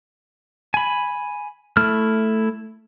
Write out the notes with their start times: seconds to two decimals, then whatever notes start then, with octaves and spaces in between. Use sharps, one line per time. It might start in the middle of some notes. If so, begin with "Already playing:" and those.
0.74 G#5 B5
1.77 A3 E4 F6